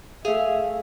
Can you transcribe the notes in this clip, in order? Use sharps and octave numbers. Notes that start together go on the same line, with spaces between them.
A3 G#4 E5 F5